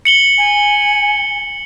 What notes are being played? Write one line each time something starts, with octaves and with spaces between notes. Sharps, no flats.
C#7 F#7 G7
G#5